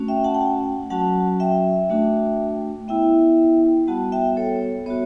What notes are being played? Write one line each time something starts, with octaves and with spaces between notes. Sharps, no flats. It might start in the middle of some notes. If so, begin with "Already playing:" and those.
Already playing: A3 C#4 F#4
E5 G5
F#5 A5
G5
F#5 A5
F#3 C#4 F#4 F#5 A5
E5 G5
A3 D4 F#4
B3 E4 E5 G5
G3 B3 F#4 F#5 A5
E5 G5
A4 C#5
B3 F#4 C#5 E5